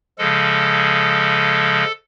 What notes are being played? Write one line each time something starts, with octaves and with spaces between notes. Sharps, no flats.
C#3 F3 G#3 A4